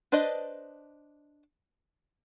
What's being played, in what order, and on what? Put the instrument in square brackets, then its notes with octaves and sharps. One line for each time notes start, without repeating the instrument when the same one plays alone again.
[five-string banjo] D4 B4 C5 D5 D#5